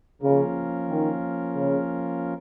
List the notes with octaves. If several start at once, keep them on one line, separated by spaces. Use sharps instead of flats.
C#3 F3 A#3 C#4 F4 A#4
D#3
C#3